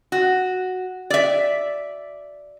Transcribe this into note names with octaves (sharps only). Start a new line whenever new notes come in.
F#4
D5 E5